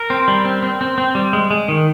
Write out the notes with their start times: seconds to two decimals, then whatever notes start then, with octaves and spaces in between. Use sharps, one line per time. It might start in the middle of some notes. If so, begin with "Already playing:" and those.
Already playing: A#4
0.10 C4
0.28 G3
0.45 C4
0.62 C4
0.81 C4
0.98 C4
1.15 G3
1.33 G#3
1.51 G#3
1.68 D#3